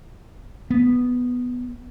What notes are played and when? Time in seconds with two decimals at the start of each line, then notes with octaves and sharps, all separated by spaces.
0.70 B3